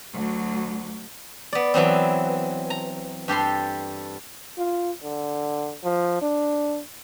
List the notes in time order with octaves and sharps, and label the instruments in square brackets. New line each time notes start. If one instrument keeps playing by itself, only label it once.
[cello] D2 F#3
[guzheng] B3 D5
E3 F#3 B3 C4
A#5
G2 G4 A4 C6
[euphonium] F4
D3
F3
D4